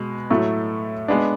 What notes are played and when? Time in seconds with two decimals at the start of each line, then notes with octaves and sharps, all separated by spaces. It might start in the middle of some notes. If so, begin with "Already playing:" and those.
Already playing: B2 G#3
0.30 A2 F#3 A3
1.08 G#3 B3 D4